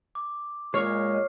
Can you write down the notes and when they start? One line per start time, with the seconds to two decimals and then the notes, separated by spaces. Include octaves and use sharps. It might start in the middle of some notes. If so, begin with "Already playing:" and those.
0.15 D6
0.74 A#2 G#3 C#5 F6 C7